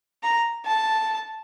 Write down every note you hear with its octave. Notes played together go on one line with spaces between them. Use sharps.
A#5
A5